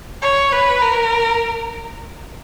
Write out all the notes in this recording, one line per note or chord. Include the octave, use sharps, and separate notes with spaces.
C#5
B4
A#4